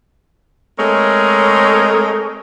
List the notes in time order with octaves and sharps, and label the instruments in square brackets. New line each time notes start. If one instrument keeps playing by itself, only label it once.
[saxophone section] G#3 A3 C4 A#4 C#5 D#5